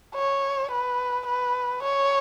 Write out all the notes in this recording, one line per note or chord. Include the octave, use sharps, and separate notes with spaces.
C#5
B4
B4
C#5